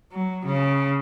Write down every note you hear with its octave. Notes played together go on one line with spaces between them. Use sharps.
F#3
C#3